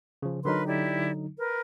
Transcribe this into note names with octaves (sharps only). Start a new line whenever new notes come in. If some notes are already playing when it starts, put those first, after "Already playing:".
C#3 F3
D3 F#3 D#4 A#4 B4 C6
E4 G4 D5
A#4 B4